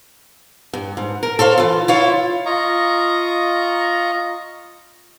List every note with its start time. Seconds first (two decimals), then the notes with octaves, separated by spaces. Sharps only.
0.73 G2
0.97 G#2
1.23 A#4
1.39 A4 C5 C#5 F5
1.58 E3 F4
1.88 E4 F4 C#5
2.46 F4 D#5 A#5 C#6